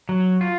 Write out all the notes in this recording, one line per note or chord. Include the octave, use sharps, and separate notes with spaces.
F#3
F4